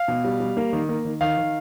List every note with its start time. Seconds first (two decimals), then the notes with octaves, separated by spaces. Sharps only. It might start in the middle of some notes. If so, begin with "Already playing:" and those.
Already playing: F5
0.08 B2
0.25 G3
0.40 G3
0.57 A#3
0.73 D#3
0.89 A#3
1.05 D#3
1.21 D#3 F5
1.37 D#3